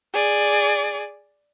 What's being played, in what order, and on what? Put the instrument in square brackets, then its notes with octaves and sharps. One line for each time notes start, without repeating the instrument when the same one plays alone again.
[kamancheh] G#4 D5